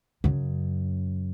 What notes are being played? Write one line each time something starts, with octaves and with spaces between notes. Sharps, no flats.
F#2 C#3